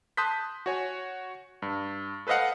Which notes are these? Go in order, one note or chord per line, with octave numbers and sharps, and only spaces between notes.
A5 C6 D#6 F#6 G6 B6
F#4 C#5 G#5
G2
A4 B4 C5 D#5 F5 F#5